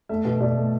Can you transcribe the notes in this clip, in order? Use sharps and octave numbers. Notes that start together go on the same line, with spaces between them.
A3 E5
B2
B2 D5
A3